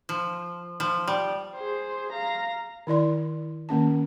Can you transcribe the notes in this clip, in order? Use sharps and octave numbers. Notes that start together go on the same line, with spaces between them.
F3
F3
G3
G#4 C5
F5 A#5
D#3 E4 D5 C6
D#3 A#3 C#4 A5